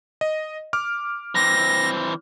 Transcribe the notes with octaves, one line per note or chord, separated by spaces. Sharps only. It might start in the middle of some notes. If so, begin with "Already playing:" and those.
D#5
D6 F6
E3 C4 A#6